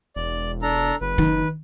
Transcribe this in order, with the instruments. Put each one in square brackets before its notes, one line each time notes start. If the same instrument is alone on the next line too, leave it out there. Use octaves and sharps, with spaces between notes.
[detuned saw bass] E1 [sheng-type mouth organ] D5
[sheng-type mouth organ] D4 A4 A#5
[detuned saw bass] F#1 [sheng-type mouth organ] B4
[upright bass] D#3